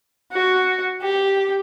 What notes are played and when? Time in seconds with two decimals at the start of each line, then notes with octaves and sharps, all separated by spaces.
0.32 F#4
1.02 G4